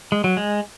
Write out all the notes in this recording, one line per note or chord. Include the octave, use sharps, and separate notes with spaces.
G#3
F#3
G#3